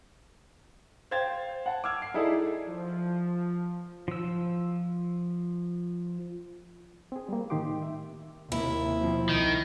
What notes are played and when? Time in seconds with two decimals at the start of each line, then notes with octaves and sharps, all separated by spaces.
1.11 C5 F5 G5 G#6 A6
1.66 F#5 A5
1.84 D6 E6 F6 G#6
2.02 C7
2.14 D#4 E4 G#4 A4 D5 E5
2.68 F3
4.08 F3 E6
7.12 C4 G#4
7.29 G3 A#3
7.50 A2 D#3 D#4 G4 C6 D6
7.82 E5
8.52 D#2 C3 A#3 E4
8.97 B2 F3 C4
9.29 C2 D#3